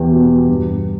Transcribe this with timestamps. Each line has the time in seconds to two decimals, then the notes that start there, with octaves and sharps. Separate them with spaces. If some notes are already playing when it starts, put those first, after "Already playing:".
Already playing: E2 G4
0.12 B2
0.48 G2